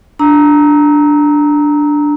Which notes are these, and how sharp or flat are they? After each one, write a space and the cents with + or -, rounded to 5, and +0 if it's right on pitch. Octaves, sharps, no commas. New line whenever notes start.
D4 +0 A#5 +0 E6 -35